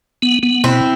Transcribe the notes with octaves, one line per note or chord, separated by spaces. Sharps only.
B3
B3
B2 C4 E4